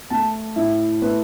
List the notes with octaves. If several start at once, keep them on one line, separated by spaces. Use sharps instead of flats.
A3 A5
A2 E5
A3 B4